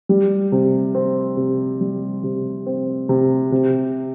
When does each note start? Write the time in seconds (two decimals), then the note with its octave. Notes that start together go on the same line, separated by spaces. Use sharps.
0.09 G3
0.52 C3
0.95 C4
1.37 C3
1.81 G3
2.24 C3
2.66 C4
3.09 C3
3.52 C3